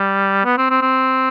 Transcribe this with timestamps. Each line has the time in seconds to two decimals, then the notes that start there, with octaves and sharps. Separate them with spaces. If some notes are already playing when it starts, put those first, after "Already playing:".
Already playing: G3
0.45 B3
0.58 C4
0.70 C4
0.81 C4